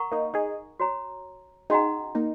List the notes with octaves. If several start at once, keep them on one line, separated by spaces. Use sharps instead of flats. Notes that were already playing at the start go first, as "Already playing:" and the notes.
Already playing: A#4 F#5 A#5 C#6
A#3 D#4
D#4 G#4
F#4 C#5 A#5
C#4 D#4 F#4 G#4 D#5 F#5 A#5
A#3 D#4